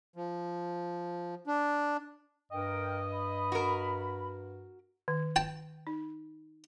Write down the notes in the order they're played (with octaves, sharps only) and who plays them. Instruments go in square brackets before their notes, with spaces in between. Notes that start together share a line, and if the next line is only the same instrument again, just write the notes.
[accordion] F3
D4
[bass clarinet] G2 [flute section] A#4 G5 [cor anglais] D#5
[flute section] B5
[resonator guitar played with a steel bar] F#4 A#4
[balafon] D#3
[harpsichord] G5 A5
[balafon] D#4